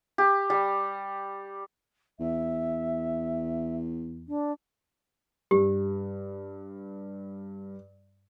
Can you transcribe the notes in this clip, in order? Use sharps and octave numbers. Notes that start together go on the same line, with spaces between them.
G4
G3
E2 E5
D4
G2 G4